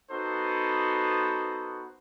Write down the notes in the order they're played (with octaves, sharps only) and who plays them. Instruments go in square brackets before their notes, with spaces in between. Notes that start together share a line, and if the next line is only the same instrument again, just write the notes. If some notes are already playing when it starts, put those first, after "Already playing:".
[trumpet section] B3 D#4 F#4 A4 C5